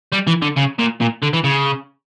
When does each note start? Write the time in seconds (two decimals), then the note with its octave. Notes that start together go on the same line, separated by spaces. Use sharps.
0.12 G3
0.27 E3
0.42 D3
0.56 C#3
0.79 A#2
1.01 A#2
1.23 D3
1.33 E3
1.44 C#3